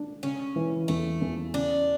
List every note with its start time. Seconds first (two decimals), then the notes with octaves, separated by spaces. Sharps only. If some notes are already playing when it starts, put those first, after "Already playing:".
Already playing: D4
0.23 C#3 C#4
0.56 E3
0.88 E2 A3
1.21 E2
1.54 C#3 D4